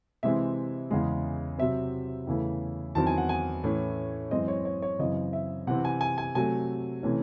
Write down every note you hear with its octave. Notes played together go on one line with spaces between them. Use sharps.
C3 E3 G#3 C4 E5
E2 C#3 G#3
C3 F#3 C4 E5
E2 C#3 E3 A3
E2 D#3 F#3 C4 A5
G#5
F#5
G#5
A2 E3 A3 C#4
F#2 E3 G#3 C4 D#5
C#5
C#5
C#5
F#2 C#3 E3 C4 D#5
E5
C3 E3 C4 F#5
G#5
G#5
G#5
C3 F#3 A3 G#5
C3 E3 A3 C#4